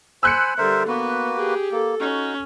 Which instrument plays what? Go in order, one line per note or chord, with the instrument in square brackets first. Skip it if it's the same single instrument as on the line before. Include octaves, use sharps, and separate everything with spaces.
[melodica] C5 G#5 B5 [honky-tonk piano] E6 F#6 C#7
[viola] D3 G3 [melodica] A#4 C5 E5
[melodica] A#3 F#4 B4 [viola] B3
[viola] G4 G#4
[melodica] A#3 [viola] A4
[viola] C#4 [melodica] D#4 F#4